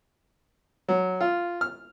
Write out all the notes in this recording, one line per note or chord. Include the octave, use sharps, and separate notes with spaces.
F#3
F4
F6